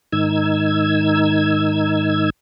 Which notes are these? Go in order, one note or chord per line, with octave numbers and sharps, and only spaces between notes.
G#2 D#3 D#4 E6 G#6